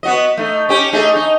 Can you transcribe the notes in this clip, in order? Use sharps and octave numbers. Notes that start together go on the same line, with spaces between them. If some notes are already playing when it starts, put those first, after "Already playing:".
B3 F#4 D#5
A3 D#4
C#4 G4
A3 D#4 G#4
D#4